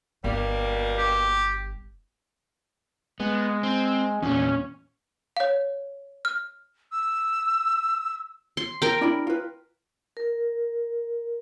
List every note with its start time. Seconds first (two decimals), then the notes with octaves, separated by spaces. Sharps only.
0.24 G1 B2 G3 A#3
0.97 G4
3.20 G#3 B3
3.63 C4
4.22 E2 A#2 C#4
5.37 C#5 F5
6.25 F6
6.92 E6
8.57 C6
8.82 A#4 G5
9.01 D4 E4 B5
9.27 F4 B4
10.17 A#4